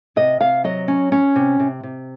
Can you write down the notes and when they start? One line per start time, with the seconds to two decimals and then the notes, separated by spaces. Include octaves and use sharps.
0.16 C3 D#5
0.40 C3 F5
0.64 F#3 D#5
0.88 C#4
1.12 C#4
1.36 C3
1.60 C3
1.83 C3